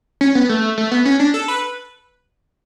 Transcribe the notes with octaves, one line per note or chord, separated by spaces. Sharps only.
C#4
B3
A3
A3
B3
C#4
D4
A4
B4